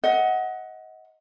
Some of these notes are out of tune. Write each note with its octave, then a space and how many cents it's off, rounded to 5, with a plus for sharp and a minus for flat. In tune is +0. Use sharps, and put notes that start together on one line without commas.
D#5 +30 F#5 +0